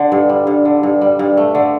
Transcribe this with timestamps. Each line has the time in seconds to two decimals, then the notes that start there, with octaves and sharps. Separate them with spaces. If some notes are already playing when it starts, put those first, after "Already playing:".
Already playing: D3
0.12 G2
0.29 G3
0.47 G2
0.65 D3
0.83 G2
1.01 G3
1.19 G2
1.37 A3
1.55 D3